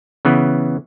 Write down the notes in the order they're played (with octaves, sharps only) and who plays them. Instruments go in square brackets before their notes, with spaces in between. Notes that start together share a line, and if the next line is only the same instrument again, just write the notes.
[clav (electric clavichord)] C#3 E3 B3